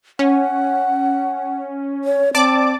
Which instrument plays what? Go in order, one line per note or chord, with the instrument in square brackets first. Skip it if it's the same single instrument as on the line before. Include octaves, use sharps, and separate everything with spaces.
[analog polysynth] C#4 [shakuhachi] F#5
[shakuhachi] C#5
[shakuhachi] C4 [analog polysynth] D5 A5 D6